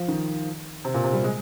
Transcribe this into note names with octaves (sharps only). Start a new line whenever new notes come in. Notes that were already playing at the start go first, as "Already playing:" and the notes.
Already playing: F3
D#3
C3
A#2
C3
G3
G#3